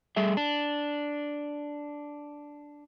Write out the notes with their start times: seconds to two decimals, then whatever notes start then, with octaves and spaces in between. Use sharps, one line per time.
0.16 G3 A3 G#4 E5
0.37 D4